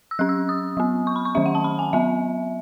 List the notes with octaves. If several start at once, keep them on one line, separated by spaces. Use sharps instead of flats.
E6
F#3 C#4 F#6
E6
D#6
F#3 B3
C#6
B5
C#6
D#3 F#3 C#4 E5
F#5
A5
B5
G#5
F#3 B3 E5